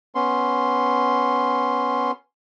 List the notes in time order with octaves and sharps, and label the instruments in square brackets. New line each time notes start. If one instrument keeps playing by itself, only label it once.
[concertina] B3 C#4 C6